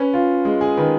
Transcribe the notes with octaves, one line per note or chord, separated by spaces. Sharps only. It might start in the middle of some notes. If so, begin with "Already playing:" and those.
Already playing: C#4 B4
F4
G#3
G#4
D#3 B4